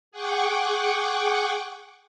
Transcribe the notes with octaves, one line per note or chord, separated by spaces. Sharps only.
G#4 F#5 G5 C#6 D6